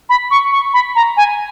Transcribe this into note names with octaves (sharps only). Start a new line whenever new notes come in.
B5
C#6
C#6
B5
A#5
G#5